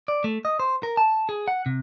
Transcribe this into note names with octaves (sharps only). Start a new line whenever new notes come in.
D5
A3
D#5
C5
A#4
A5
G#4
F#5
C3